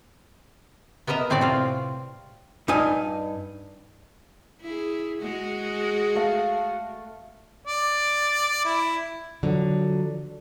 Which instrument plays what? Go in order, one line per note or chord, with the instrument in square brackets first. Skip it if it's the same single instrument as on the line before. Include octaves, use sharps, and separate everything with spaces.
[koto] B3 A#4 D#5 E5 A#5
A2 C4 F#4 D5
C3 F4
[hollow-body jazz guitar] G2 D#4 G#5
[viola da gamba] E4 G#4
G#3 F#4 G#4
[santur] A3 F5 A5
[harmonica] D5
E4
[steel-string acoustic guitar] D3 F3 F#3